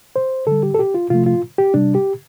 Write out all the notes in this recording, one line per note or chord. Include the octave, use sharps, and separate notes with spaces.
C5
D3 G3 A4
G4
A4
G4
F4
C3 F3 A3 F4
F4
G4
C3 G3 D4
G4